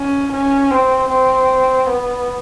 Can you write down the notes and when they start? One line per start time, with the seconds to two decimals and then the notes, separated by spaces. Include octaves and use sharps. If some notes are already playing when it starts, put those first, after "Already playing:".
Already playing: C#4
0.33 C#4
0.71 C4
1.09 C4
1.86 B3